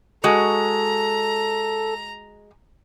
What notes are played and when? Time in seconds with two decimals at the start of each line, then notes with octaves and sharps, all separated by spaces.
0.24 G#3 F#4 A4 A#5